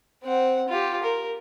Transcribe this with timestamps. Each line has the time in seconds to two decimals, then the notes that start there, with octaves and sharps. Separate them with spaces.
0.24 C4 F#5
0.68 F4 G4
1.03 A#4